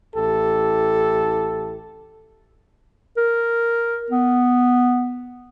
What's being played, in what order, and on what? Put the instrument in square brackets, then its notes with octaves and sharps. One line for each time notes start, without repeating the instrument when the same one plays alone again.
[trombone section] A1 E4 G4 A4
[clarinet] A#4
B3